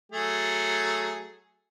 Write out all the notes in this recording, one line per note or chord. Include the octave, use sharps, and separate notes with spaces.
F#3 A3 G#4